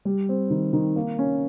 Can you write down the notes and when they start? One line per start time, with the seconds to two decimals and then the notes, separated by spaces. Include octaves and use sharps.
0.05 G3
0.29 C4
0.50 D#3
0.73 D#3
0.96 A#3
1.19 C#4